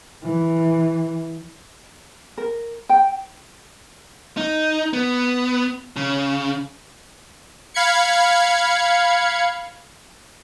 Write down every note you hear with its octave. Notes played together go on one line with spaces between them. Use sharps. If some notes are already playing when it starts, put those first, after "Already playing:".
E3
A#4
G5
D#4
B3
C#3
F5 B5 G#6 C#7